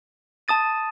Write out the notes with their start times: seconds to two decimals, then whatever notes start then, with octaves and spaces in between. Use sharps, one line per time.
0.48 A5 D#6 A6 D#7